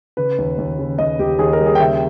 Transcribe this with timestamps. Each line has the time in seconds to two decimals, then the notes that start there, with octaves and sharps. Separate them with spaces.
0.17 C#3 B4
0.38 D#2
0.58 D#2
0.79 C#3
0.98 D#2 D#5
1.19 D#2 G4
1.39 D#2 G#4
1.53 A#4
1.60 G3
1.66 G#4
1.75 G5
1.80 C#3 E5